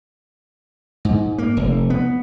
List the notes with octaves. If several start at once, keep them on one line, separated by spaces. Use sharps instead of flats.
G#2
A#3
F1
B3